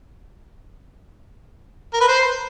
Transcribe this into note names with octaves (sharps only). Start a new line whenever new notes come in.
A#4
B4
C5